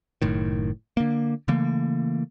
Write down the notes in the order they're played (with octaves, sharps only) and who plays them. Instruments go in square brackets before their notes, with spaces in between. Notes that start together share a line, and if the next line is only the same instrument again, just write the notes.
[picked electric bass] F#1 A2 D#3
D3 A#3
C#3 E3 A3 A#3